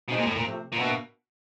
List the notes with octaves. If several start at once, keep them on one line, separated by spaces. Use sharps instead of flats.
B2 G#3 C4 D#4
A#2
A2
A#2
C3 F3 A3
A#2
B2 A#3 D4 F#4 B4 E5